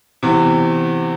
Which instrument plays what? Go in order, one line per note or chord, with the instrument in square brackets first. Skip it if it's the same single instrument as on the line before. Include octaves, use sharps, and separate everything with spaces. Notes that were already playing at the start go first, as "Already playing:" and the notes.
[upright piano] E2 C3 E3